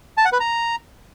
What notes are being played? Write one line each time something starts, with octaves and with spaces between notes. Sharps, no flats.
A5
F#5
B4
A#5